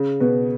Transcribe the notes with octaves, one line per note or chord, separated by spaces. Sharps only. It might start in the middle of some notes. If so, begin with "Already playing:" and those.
Already playing: C#3
B2 B3